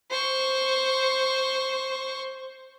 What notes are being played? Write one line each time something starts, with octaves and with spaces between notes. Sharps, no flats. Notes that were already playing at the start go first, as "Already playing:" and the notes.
C5 C#6